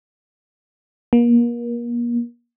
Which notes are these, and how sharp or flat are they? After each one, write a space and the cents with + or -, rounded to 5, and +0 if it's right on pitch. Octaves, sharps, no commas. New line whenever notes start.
A#3 +35